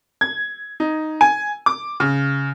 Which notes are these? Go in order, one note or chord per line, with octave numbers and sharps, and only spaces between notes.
G#6
D#4
G#5
D6
C#3